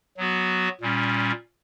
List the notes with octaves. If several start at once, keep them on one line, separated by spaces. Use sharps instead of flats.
F#3 B3 F#4
A#2 G3 C#4